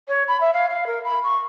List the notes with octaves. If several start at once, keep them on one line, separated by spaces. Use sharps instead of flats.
C#5
B5
E5
F5
F5
A#4
B5
C#6